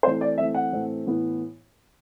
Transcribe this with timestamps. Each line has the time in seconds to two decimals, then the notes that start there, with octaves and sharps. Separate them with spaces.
0.03 E3 A3 C4 C5
0.21 D5
0.38 E3 A3 C4 E5
0.55 F#5
0.72 A2 E3 A3 C4
1.07 A2 E3 B3